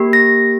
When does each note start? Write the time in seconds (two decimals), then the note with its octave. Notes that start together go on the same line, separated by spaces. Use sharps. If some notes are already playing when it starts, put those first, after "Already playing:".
Already playing: A#3 G4
0.13 A#6